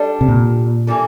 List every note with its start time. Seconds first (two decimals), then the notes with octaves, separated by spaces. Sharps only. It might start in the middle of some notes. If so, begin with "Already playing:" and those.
Already playing: G3 D4 A4
0.21 C3
0.28 A#2
0.87 E3 G3 A#3 D4 A4